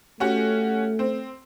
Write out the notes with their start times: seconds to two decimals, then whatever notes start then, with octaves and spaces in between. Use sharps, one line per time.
0.20 A3 C#4 F#4 G4
0.99 C4